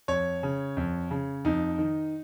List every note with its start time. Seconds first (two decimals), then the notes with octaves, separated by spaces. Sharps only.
0.08 F2 C#5
0.43 C#3
0.77 F2
1.11 C#3
1.44 F2 D#4
1.78 D#3